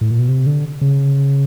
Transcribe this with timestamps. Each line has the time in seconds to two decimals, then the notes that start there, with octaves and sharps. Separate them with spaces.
0.01 A2
0.10 A#2
0.19 B2
0.29 C3
0.46 D3
0.81 C#3